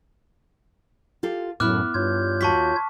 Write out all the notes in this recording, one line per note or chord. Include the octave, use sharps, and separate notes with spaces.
F4 G4 A4
F#2 A2 B3 E4 D6 F6 F#6
G2 F4 C#5 G6
D#2 F#4 A5 C#6 B6